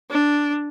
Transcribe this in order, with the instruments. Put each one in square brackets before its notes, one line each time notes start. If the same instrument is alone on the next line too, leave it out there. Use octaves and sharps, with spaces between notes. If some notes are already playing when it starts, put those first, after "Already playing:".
[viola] D4